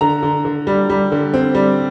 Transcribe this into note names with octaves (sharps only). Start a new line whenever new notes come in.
D3 A#5
D3
D3
G3
G3
D3
C4
G3